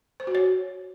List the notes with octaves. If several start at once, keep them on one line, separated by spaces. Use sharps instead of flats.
C5
F#4
C#5